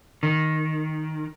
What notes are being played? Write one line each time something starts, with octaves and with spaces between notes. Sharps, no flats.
D#3